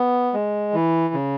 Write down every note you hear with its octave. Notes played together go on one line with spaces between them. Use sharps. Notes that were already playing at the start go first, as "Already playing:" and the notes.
Already playing: B3
G#3
E3
C#3